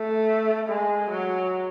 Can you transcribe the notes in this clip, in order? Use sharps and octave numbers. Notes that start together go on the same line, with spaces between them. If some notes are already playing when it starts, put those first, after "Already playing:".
Already playing: A3
G#3
F#3